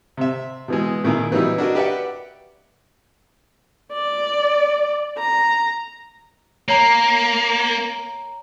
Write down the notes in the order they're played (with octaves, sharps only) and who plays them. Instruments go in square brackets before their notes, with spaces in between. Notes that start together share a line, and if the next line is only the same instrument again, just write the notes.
[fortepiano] C3 E5
B2 E3 G#3
A#2 D#3 A#3 E4 G#4 A#5
A#2 E3 F#3 G3 D#4 E4
D4 F#4 A#4 D#5
G4 B4 D5 E5 F#5
[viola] D5
A#5
[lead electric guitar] A#3 [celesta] C#5 A#5